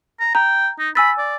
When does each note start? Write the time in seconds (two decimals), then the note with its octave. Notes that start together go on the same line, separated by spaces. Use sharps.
0.20 A#5
0.35 G5 A#5
0.79 D#4
0.95 G#5 B5 E6 A6
1.18 D5